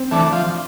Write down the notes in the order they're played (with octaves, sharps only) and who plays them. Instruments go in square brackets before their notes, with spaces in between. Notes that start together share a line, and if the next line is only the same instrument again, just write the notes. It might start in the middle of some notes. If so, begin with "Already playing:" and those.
Already playing: [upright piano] C4 C5
[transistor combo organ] E3 A3 D4
F3